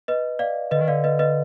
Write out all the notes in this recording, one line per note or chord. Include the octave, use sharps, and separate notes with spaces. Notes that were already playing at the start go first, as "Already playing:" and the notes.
B4 D#5
D5 F5
D3 B4 D#5
D#3
D3 D5 F5
B4 D#5
B4 D#5